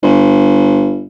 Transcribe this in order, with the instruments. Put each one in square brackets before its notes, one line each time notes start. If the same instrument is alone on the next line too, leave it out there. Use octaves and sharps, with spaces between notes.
[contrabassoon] G1